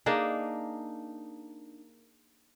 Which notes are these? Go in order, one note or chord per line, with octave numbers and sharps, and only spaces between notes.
A#3 D4 D#4 G#4